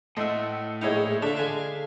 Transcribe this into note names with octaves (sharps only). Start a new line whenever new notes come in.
A2 A3 C5 D#5 E5 F#5 E6
A#1 G#3 D#4 E4 C#5 F5
D3 D4 E5 F5
D3 G#3 E5 F5 G#5